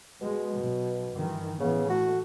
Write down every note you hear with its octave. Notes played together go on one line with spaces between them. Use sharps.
B2 G#3
B1
G2 D#3 E3
A1 C#3 E3 B3
A3 F#4